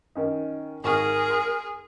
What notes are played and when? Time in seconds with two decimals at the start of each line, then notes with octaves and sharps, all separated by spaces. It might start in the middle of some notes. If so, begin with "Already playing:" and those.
0.15 D#3 C#4 D#4
0.84 G#1 G#4 A#4 C#6 F6
1.30 C6